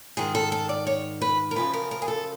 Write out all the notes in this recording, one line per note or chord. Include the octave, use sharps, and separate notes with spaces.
G#2 D#3 G#4
A4
A4
D5
C#5
B4
A#4
F#2 C#3 F3 B4
A#4
A#4
G#4
A4